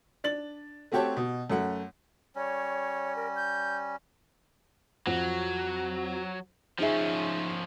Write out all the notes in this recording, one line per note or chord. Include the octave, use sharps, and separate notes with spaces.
D4 A6 F#7
A3 C4 F#4 G4 C#5 A5
B2
F#2 A3 F#5
G3 C#4 C#5
A#4
G6
F2 F#3
F3 C#4 D#4 G#4 E5